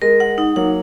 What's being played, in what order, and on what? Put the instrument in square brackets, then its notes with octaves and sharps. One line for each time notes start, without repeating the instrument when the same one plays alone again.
[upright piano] G#3 [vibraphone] A#4
[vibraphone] F#5
D#4
[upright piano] F#3 A#3 [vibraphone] F#5